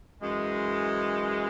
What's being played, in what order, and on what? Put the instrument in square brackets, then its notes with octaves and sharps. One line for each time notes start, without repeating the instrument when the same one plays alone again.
[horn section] F#2 E3 G#3